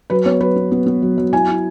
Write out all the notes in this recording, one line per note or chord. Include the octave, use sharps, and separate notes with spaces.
F#3 B4
B3 C#5
F#3 B4
B3
B3
B3
F#3
F#3
E4 G#5
E4